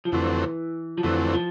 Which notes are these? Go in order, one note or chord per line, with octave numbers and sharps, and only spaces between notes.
F3
F2 D3 E3 F#3 A3 C4
F3
F2 D3 E3 F#3 A3 C4
F3